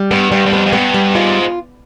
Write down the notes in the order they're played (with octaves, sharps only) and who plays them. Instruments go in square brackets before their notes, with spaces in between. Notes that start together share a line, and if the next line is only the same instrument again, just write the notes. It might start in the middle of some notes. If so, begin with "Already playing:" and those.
Already playing: [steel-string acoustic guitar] G3
[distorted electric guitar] G2 [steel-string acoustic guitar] B3
[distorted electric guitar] G2 [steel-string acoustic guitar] G3
[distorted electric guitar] G2
[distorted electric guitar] F2 [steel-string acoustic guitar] B3
[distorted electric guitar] F2
[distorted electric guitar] G2 [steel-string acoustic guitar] B3
[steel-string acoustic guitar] G3
[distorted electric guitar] G#2 [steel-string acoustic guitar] F4